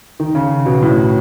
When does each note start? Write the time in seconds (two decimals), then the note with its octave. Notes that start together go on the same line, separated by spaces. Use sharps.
0.20 D#3
0.35 C#3
0.66 B2
0.82 A2